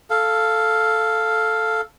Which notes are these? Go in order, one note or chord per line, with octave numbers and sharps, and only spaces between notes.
A4 F5